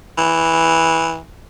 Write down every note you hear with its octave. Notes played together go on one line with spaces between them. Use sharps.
E3